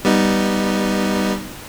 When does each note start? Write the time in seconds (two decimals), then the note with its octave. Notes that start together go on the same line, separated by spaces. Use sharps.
0.05 G3 B3 D#4